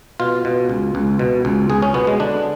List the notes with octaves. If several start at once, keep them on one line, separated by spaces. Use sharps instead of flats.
B2 F4
B2
C#2
C#2
B2
C#2
C#2 G#4
C#4
B2 B3
G#3
D3 D4